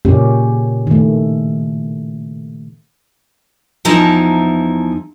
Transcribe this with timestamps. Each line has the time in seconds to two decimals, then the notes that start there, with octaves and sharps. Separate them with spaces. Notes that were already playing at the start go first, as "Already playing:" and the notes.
0.05 A#2 C#3 A#3 C#4 G4
0.87 D#3 A3
3.85 E2 F3 D#4 E4 A5 A#5